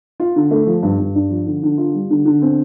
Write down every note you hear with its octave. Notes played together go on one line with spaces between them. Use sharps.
F4
D3
A3
F3
G2
G2
D4
F3
D3
D3
F4
G3
D3
D3
C4